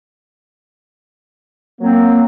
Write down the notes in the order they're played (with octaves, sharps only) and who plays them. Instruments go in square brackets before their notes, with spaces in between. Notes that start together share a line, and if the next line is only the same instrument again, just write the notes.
[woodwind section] F#3 C4 [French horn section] A#3